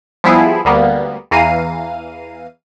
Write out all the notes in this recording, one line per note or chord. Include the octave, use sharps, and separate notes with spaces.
F3 G3 B3 E4 G#4
D2 G3 A#3 B3
E2 E3 F5 A#5 C7 D#7